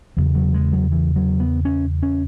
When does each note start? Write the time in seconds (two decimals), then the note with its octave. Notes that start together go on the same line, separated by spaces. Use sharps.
0.17 E2 C#3 F#3
0.35 F#3
0.54 G#3
0.72 F#3
0.92 E3
1.16 F#3
1.40 B3
1.65 C#4
2.02 C#4